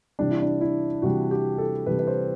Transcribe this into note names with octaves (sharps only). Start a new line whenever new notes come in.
C3 E3 G3 D4
E4
D4
E4
C3 E3 G3 F#4
G4
A4
C3 E3 G3 B4
B4
C5